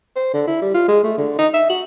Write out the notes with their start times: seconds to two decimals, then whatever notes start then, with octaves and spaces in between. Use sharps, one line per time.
0.16 C5
0.33 D3
0.47 E4
0.62 G3
0.74 F4
0.88 G#3
1.03 A3
1.18 D3
1.38 D#4
1.54 E5
1.70 F#4